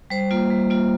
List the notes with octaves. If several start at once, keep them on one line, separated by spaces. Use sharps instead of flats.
G3 C5
A#3 F4
G3
A#3 F4